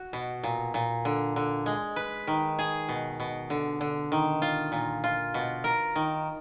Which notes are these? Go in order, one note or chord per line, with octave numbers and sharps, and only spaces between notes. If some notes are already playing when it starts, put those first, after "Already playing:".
Already playing: F#4
B2
A#2
A#2
D3
D3
G#3
B4
D#3
G#4
B2
B2
D3
D3
D#3
F4
A#2
F4
B2
A#4
D#3